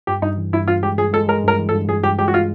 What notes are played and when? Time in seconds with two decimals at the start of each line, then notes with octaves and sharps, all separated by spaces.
0.07 G2 G4
0.22 G2 D#4
0.38 E3
0.53 G2 E4
0.68 G2 F4
0.83 G#3 G4
0.98 G2 G#4
1.13 G#3 A4
1.28 G#3 A#4
1.44 G2 A#4
1.59 E3
1.69 A4
1.74 G2
1.88 G2 G#4
2.03 G2 G4
2.18 G#3 G4
2.28 F#4
2.34 F4